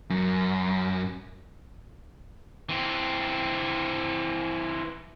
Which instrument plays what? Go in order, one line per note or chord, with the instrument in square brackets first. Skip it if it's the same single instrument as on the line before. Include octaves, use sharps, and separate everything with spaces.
[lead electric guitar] F#2
[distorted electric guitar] E3 C4